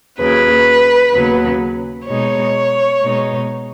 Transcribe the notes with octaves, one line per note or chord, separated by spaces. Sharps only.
D#2 C#3 F#3 B4
D#2 C#3 F#3 B3
B2 G#3 D#4 C#5
B2 G#3 D#4